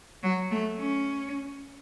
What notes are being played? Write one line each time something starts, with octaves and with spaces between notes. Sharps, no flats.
F#3
A3
C#4